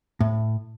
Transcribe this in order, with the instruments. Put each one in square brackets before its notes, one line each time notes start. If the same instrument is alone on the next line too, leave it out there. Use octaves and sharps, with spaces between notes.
[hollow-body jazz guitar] A2